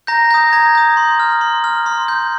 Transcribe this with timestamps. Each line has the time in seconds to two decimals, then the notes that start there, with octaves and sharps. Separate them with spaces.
0.07 A#5 G6 A#6
0.31 D#6 G6
0.52 A#5 G#6
0.75 D#6 G6
0.97 C6
1.19 F6
1.41 C6
1.64 F6
1.86 C6
2.08 G6